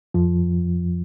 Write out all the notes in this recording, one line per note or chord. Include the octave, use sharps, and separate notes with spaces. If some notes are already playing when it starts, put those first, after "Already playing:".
F2 F3